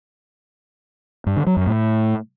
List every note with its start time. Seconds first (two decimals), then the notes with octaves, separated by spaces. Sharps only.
1.27 G2
1.37 D3
1.47 F#3
1.57 F#2
1.67 A2